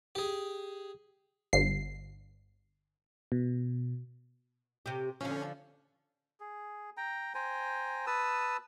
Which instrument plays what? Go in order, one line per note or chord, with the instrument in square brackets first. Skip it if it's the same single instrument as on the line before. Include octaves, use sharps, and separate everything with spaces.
[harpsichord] G4 G#4
[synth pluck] G1 C7
[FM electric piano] B2
[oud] C3 G4
[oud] D3 F3 [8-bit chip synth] C#4
[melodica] G#4
G5 A#5
C5 G5 G#5 A#5
B4 A5 D#6 E6